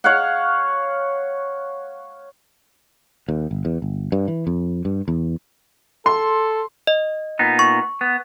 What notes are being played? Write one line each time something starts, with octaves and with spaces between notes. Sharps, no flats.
C#5 F5 F#5
D#2
G1
E2
G1
G2
E3
F2
G2
E2
A4 C6
D#5
A#2 B3 D#4
C#6
B3